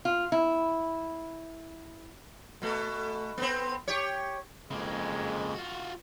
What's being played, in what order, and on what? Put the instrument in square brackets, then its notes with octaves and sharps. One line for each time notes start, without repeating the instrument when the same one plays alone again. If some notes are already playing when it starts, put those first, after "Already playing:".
[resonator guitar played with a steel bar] F4
E4
[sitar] B2 A3
B3 C4
G4 C#5
[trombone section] F2 G#3 [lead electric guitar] C#3 A#3
[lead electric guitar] F4 F#4